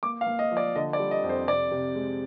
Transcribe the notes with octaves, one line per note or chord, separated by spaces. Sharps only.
A#3 D6
F5
A#3
D#5
F3
D5
D3 D#5
D5
G3
D#5
F2
C5
C3 D5
C3
G#3